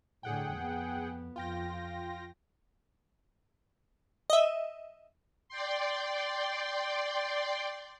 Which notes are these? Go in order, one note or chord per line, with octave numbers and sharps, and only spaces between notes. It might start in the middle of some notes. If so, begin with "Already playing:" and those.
A2 D3 G#4 F#5 G5
F2 B3
F2 F4 G5 A#6
D#5 E5
D5 G5 C6